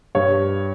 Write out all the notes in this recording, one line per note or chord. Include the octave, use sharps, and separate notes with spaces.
G2 C#5